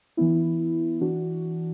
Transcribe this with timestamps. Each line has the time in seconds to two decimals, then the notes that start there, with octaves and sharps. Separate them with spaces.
0.17 E3 B3 E4
1.01 E3 D4 F#4